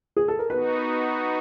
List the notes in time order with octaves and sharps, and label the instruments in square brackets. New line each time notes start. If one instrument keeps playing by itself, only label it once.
[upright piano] G#4
A4
A#4
[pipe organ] B3 D#4 F#4 [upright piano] B4